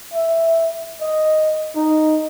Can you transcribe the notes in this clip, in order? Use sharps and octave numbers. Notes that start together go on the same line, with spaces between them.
E5
D#5
D#4